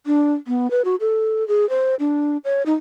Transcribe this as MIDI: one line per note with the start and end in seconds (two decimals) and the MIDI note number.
0.06 0.34 62
0.47 0.70 59
0.71 0.82 71
0.85 0.96 66
1.00 1.47 69
1.48 1.68 68
1.70 1.95 72
2.00 2.37 62
2.44 2.63 73
2.66 2.74 63